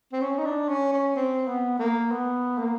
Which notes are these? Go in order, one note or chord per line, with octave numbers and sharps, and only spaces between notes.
C4
C#4
D#4
D4
C#4
C#4
C4
B3
A#3
B3
A#3